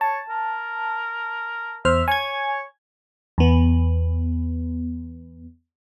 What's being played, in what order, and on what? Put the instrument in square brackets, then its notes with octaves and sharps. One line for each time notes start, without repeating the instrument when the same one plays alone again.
[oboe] C#5 [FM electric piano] A5
[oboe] A#4
[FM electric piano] E2 C5 F6 [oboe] E5
[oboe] C#5 [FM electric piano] G#5 G#6
[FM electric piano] E2 B3